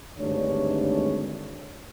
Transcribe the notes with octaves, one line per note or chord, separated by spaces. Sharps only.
G#1 D2 G2 G#3 D4 C#5